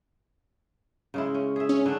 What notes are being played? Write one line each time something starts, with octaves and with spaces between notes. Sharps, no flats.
C#3 G#3 E4
C#4
G#4 E5
C#4
D3 D4